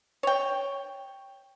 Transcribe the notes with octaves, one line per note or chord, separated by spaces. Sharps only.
C#5 G5